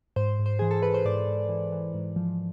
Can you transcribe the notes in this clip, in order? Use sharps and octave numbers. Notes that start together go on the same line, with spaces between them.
G#2 C5
G#2
C5
E3 G#4
A4
E3 B4
C5
G#2 D5
G#2
E3
E3
G#2
F3